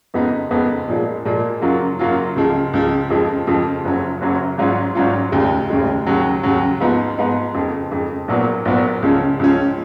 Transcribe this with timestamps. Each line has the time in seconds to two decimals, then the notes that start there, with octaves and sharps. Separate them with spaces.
0.14 F2 C#3 G#3 B3 D#4
0.51 F2 C#3 G#3 B3 D#4
0.88 A#2 F3 G#3
1.25 A#2 F3 G#3
1.61 F#2 C#3 F#3 A#3 F4
1.99 F#2 C#3 F#3 A#3 F4
2.36 C#2 C#3 F3 G#3
2.73 C#2 C#3 F3 G#3
3.10 F2 C#3 F3 G#3
3.47 F2 C#3 F3 G#3
3.84 F#1 F#2 C#3 F#3 C#4
4.21 F#1 F#2 C#3 F#3 C#4
4.58 G#1 G#2 F#3 C#4 F4
4.95 G#1 G#2 F#3 C#4 F4
5.32 F1 D#2 C#3 G#3
5.70 F1 D#2 C#3 G#3
6.07 D#2 C#3 F#3
6.43 D#2 C#3 F#3
6.81 G#2 F3 B3 D#4
7.18 G#2 F3 B3 D#4
7.54 F2 C#3 G#3
7.91 F2 C#3 G#3
8.28 A#1 A#2 F#3 B3
8.65 A#1 A#2 F#3 B3
9.02 C#2 C#3 F3 G#3 C#4
9.39 C#2 C#3 F3 G#3 C#4